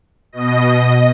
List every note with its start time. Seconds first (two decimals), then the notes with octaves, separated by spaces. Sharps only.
0.32 B2 D#5